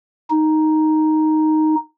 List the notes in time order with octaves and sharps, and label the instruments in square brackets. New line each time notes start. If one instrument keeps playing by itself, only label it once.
[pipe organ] D#4